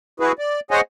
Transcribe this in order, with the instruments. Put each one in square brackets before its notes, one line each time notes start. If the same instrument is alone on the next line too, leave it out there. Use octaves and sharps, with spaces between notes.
[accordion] E4 F#4 G#4 B4
D5
G#4 C5 C#5 D#5 F#5 G#5